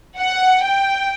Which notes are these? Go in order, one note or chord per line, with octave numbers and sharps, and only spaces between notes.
F#5
G5